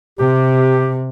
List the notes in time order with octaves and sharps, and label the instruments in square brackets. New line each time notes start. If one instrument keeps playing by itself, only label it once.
[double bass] C3 [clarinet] G4